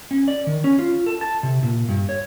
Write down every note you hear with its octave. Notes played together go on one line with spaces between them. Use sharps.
C#4
D5
D#3
C#4
F4
A4
A5
C3
A#2
G2
C#5